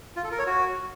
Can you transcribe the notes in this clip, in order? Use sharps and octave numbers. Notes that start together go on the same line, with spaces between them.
F4
A4
A#4
C#5
F#4